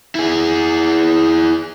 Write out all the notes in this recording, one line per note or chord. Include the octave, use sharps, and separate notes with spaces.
E4 G#4